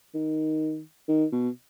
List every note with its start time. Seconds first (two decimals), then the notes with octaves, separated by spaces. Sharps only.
0.14 D#3
1.08 D#3
1.32 B2